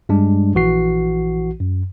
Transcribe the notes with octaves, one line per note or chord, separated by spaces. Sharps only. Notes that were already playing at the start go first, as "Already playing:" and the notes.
G2 G3 G#3 D4
A#1 E3 F#4 C7
F#2